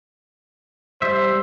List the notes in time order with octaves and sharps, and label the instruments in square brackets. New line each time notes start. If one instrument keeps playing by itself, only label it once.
[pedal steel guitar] G3 E5 [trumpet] C5